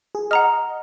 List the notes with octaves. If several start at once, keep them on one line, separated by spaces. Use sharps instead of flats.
G#4
D#5 F#5 A#5 F6